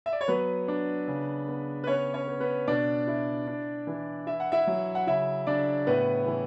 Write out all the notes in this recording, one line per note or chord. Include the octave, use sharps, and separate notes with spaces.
E5
D5
C#5
F#3 B3 B4
D4
C#3
B3
B4
B3 C#4 C#5
C#4 C#5
B3
B3 B4
B2 D4 D5
E4
D4
E3
E4 E5
F#5
E4 E5
F#3
F#5
C#3 E4 E5
C#3 D4 D5
A2 B3 B4
E3